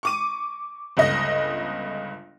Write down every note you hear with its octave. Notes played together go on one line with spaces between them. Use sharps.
C#6 D6 D#7
G1 C#2 D#5 A#6